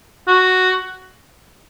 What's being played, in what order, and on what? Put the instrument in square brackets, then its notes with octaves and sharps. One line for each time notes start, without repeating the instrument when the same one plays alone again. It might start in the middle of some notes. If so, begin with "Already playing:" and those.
[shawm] F#4